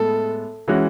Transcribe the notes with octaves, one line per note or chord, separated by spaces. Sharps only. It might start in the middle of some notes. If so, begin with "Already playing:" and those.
Already playing: A2 G#3 B3 A4
E3 G#3 C#4 F#4